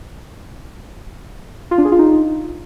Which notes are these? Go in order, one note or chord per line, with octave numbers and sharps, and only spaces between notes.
F4
D4
G#4
F4
D#4